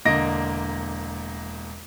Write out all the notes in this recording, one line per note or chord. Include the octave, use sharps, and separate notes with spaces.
E1 D3 A#3 D#5 A#6 D7